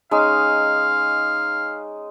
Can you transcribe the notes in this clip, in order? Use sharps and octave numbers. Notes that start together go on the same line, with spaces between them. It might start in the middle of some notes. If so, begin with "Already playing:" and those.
G#3 C#4 D#4 F5